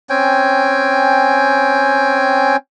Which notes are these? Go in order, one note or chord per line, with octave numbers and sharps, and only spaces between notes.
C4 C#4 G5 G#5